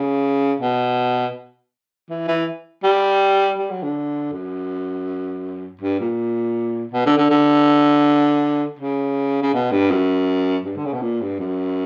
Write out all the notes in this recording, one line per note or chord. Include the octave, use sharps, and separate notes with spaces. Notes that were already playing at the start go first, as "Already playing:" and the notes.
Already playing: C#3
B2
E3
E3
G3
G3
F#3
D3
F#2
G2
A#2
B2
D3
D3
D3
C#3
C#3
B2
G2
F#2
G2
D3
C#3
B2
A#2
G2
F#2